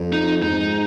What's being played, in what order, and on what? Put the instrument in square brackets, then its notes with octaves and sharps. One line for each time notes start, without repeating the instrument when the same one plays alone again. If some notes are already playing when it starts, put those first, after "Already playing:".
Already playing: [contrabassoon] F2
[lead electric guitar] D#4
[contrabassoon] G#2 [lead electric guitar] D#4